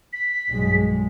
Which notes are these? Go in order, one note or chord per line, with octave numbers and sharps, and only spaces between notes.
B6
B1 G2 G#3